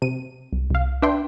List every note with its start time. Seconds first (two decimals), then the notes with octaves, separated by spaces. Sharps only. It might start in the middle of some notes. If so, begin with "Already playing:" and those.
0.02 C3 D#7
0.53 C2
0.70 C2 F5
1.02 D4 B4 E5 G5 C6